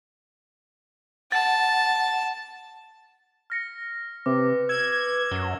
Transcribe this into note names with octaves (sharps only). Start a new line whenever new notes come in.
F#5 A5 A6
F6 A#6 C#7
C3 B4 D6
E6 G#6 E7
F#2 G#6 G7